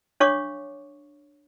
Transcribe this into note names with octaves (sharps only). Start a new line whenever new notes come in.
D4 C#5 F5 C#6 D6